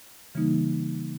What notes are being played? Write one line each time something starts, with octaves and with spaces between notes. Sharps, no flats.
C#3 E3 G3 A#3 D#4